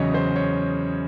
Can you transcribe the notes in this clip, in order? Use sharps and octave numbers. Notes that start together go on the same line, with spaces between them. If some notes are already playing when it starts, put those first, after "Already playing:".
Already playing: E2 C#3 F#3 C#5 D#5
C5
C#5